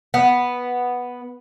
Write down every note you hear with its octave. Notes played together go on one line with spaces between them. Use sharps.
B3